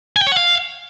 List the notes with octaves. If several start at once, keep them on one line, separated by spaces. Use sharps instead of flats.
G#5
G5
C#5
F#5
F5